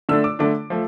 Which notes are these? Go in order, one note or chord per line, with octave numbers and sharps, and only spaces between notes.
D3 A3 D4 E6
D6
D3 A3 D4 D6
F3 A3